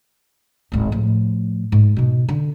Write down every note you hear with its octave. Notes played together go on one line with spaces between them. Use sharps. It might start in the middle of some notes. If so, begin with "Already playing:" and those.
D1 G#1
A2 F3
G#2
B2 D#4
D3